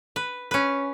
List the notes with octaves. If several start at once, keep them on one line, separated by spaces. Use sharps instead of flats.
B4
C#4 B4